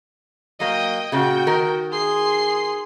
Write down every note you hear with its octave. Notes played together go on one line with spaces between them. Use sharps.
F#3 A#3 D#5 G5
A#2 C#3 F#4 G5
D#3 A#4
G#4 C6 C7